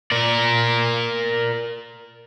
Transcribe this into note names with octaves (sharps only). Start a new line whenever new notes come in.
A#4 D5